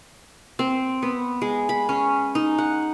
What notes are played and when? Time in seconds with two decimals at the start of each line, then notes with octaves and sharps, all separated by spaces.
0.59 C4
1.02 B3
1.41 G#3
1.69 B5
1.89 C#4
2.35 D#4
2.58 F#5